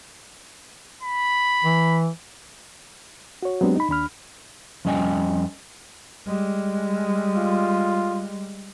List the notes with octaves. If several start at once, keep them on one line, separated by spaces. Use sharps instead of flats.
B5
E3
F#4 C#5
F#3 G#3 B3 C4 D4 G4
D#4 B5
D#2 D4 B5 F6
F2 G3 C#4 D#5 G5 G#5
G3 G#3
F4